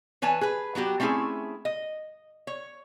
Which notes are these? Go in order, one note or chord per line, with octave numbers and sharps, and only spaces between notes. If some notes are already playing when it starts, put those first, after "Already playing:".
E3 B4 C#5 G#5 A5
G#4 B4
F#3 B3 F#4 G4
A3 C4 C#4 E4 G#4
D#5
C#5